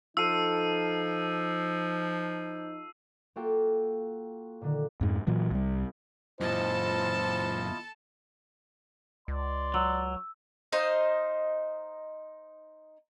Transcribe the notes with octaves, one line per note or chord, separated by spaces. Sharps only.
F3 D#4 F4 A4 E6 C7 D#7
A#3 F4 F#4 A4 F5 G5
A#2 D3 D#3
F2 G#2
A#2 E3 F#3
C2 G3
F#2 A#2 E4 F4 A4 C5 D#5 A5
C#2 D5 C6
F#3 E6
D#4 C5 D#5 F5